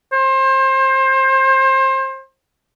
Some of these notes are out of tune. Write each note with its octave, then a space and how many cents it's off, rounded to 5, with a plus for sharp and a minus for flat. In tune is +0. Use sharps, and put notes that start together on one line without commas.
C5 +30